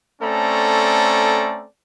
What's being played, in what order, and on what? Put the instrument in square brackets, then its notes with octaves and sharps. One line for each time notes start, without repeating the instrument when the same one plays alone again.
[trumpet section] A3 C4 C#4 A4 D5 A#5